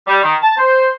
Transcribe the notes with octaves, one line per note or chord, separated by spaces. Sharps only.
G3
D#3
A5
C5